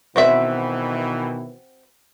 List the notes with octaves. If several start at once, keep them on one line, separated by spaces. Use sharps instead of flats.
B2 D#3 E3 C4 F#4 E5